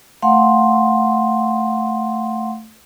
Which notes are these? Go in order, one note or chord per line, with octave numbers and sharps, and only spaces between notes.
A3 F5 F#5 C6